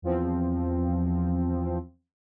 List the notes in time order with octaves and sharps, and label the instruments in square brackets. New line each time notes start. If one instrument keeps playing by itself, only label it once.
[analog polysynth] E2 F3 C4